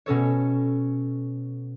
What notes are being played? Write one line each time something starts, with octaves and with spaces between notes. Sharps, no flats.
B2 C#4 A4 C#5